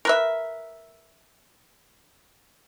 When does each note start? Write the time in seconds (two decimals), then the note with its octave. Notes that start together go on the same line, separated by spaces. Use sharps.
0.05 A#4 B4 E5